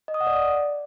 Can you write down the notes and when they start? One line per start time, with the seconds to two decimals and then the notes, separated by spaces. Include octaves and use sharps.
0.08 D#5
0.14 D#6
0.21 F#5
0.27 D5